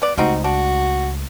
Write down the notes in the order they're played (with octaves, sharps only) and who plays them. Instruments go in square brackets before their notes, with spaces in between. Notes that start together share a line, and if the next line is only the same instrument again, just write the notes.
[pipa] B3 D5
[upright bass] C#2 A3 [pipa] G3 C4 D#4 [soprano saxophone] F#4
[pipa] D4 [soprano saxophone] F#4